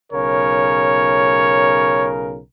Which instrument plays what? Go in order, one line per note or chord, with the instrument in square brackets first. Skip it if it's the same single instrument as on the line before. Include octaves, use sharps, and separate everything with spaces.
[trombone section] B1 C#3 A#4 [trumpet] C#5